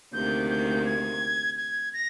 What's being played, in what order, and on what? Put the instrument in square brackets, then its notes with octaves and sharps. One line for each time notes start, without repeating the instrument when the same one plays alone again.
[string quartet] D2 C3 D#3 A#3 [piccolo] G6
[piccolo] G6
G#6
G#6
A#6